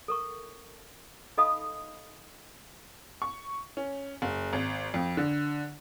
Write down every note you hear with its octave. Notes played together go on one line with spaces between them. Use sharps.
A4 A#4 C#6
D#4 A4 D#5 F5 B5 D#6
C#6
C#4
F#1
G#1
F2
D3